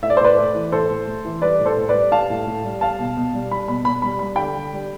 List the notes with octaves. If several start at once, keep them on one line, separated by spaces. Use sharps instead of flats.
A2 E5
D5
C5
A2 B4 D5
A3
E3
A2 A4 C5
A2
A3
E3
G3 B4 D5
A2
A4 C5
A2
B4 D5
G3
G3 F5 A5
A2
A2
G3
G3 F5 A5
B2
B2
G3
G3 B5
B2 B5
B2 B5
G3 B5
G3 B5
D3 G5 B5
D3
G3